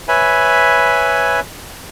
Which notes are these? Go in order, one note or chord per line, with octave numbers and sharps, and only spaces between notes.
B4 C#5 E5 G#5 B5